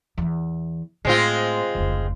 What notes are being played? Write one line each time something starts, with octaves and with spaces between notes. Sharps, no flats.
E2 E3
A2 G#3 C4 F4
F1 C#2